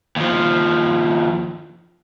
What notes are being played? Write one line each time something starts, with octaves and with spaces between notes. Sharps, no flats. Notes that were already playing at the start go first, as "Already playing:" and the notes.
D#2 F3